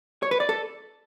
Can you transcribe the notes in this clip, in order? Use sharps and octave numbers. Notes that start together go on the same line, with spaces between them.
C#5
B4
D5
A4